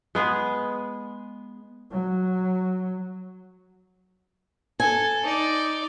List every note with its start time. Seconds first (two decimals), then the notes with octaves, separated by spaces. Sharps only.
0.15 G#3 B3 G#4
1.91 F#3
4.80 A4 G#5
5.23 D#4 D5